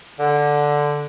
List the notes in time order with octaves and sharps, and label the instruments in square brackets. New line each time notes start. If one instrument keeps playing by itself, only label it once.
[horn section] D3